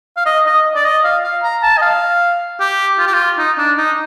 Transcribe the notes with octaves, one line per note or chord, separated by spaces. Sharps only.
F5
D#5
D#5
D5
D#5
F5
F5
A#5
A5
D#5
F5
G4
F4
G4
F4
D#4
D4
D#4